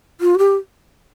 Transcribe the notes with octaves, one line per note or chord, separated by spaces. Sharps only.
F4
F#4
G4